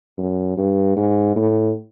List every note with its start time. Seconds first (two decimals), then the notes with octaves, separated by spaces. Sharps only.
0.18 F#2
0.57 G2
0.97 G#2
1.36 A2